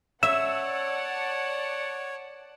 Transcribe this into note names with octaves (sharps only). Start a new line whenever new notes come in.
C#5 D5 E5 F#5 A5 E6